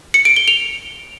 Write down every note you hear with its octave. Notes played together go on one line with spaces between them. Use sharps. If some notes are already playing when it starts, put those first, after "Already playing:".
C#7
D7
G7
F7